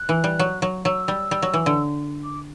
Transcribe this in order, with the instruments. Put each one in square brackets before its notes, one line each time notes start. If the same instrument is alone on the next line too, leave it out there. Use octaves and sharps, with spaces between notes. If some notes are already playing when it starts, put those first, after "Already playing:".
Already playing: [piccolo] F#6
[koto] E3
G3
F#3
F#3
[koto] F#3 [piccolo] E6
[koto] G3
G3
F#3
E3
D3
[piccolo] D6